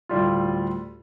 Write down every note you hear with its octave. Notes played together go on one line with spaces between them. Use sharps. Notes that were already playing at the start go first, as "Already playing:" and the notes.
D2 A2 G3 F4